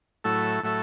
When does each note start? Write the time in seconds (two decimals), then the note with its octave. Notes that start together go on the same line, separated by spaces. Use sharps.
0.24 A2 F#3 A3 E4 A4
0.63 A2 F#3 A3 E4 A4